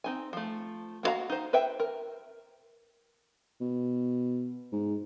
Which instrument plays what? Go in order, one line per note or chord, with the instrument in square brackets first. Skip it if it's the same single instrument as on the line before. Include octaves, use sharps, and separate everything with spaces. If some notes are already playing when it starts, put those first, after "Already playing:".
[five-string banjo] C4 D#4 G#5
F3 A3
A#3 B3 F#4 F5 A#5
D#4 C5
B4 C5 E5 G5
A#4
[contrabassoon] B2
G#2